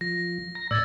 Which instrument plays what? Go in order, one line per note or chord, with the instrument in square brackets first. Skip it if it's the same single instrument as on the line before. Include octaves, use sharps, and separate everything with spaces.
[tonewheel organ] F3 [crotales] A#6
[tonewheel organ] A#5 A#6
[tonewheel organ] A2 D5 [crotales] E6 G#6 A6